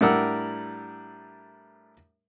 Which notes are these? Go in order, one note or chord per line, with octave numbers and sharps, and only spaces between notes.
A2 G3 D4 A#4 F#5 E6